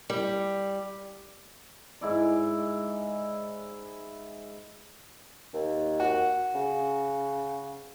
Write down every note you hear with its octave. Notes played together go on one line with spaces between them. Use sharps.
G3
G#2 E4 D5
D#2
F#4
C#3